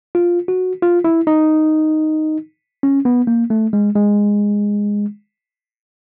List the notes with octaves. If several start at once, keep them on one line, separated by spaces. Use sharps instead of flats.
F4
F#4
F4
E4
D#4
C#4
B3
A#3
A3
G#3
G#3